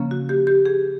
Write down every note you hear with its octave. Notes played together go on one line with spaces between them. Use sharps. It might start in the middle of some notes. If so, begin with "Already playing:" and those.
Already playing: C#3 F3 A#3 C#4
F#4
G4
G4
G#4